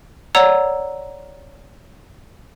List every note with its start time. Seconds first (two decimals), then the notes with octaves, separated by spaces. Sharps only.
0.35 C#5 D5 F#5 A#5 E6